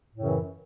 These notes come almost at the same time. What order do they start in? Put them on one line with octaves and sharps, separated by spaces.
A2 C#3 F#2 E3